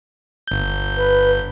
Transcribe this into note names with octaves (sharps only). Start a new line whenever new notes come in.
G1 G6
B4